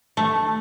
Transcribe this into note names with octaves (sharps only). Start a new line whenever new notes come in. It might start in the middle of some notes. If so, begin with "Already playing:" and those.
A3